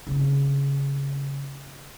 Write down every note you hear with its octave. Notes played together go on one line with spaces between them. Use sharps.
C#3 C4